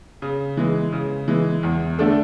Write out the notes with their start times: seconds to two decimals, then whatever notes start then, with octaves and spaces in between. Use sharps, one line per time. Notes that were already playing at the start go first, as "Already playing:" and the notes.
0.22 C#3
0.57 E3 G#3
0.93 C#3
1.28 E3 G#3
1.63 E2
1.99 D3 A3 D4 A4